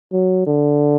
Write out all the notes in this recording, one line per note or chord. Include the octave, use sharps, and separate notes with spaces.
F#3
D3